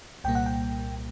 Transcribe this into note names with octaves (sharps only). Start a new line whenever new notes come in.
C2 A#2 G3 A#3 G5
F#5
G5